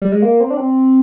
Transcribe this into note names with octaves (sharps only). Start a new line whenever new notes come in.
G3
G#3
A#3
C4
D4
C4